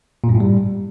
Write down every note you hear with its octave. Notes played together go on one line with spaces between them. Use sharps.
A#2
G2
A2
G3